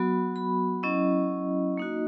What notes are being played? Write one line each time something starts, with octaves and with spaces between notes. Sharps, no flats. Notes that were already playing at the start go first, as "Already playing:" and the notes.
Already playing: F#3 B3 F#4 B5
B5
F#3 C#4 E4 D#5
A#3 D#4 F#4